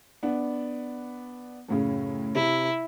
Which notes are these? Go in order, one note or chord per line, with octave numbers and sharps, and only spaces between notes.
B3 D4
F#2 A2 C#3
C3 E4